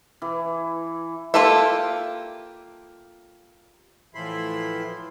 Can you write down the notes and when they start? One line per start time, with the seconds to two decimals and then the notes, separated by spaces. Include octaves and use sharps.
0.22 E3
1.34 A#3 F4 G4 A4 E5
4.15 A2 E3 F3 E4 B5 C6